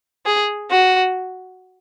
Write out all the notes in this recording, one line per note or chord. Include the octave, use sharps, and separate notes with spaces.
G#4
F#4